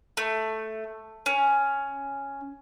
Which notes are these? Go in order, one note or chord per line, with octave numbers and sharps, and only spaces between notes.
A3
C#4